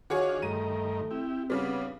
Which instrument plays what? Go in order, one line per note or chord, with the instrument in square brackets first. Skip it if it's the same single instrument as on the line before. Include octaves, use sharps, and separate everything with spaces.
[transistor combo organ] D#3 D4 F4 [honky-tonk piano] F#4 G#4 C#5
[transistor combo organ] G2 D#3 A#4 [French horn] A3 [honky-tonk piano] D#7
[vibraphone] C4 [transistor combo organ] E4 G4
[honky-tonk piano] C#3 G3 [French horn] B3 [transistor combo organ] D4